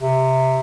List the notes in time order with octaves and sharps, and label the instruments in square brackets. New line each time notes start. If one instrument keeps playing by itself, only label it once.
[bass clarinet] C3